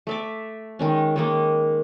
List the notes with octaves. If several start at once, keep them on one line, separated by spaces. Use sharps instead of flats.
A3 E5 D6
D#3 G#3 C#4
D#3 G#3 A#3